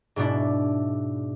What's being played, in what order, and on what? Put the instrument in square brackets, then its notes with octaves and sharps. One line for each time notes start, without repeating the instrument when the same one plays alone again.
[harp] G#2 B2 D4 E4